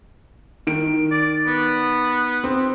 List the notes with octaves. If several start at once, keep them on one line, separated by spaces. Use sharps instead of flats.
D#3 D7
D5
B3
C4